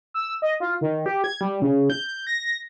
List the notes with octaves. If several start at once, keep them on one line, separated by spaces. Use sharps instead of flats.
E6
D#5
F4
D#3
G4
G#6
G3
C#3
G6
A#6